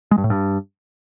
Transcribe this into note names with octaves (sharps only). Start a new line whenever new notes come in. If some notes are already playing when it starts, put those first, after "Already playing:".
G#3
G2
A2
G2